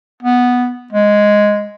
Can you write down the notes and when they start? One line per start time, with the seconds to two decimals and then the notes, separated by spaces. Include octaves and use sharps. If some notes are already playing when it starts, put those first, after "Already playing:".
0.23 B3
0.92 G#3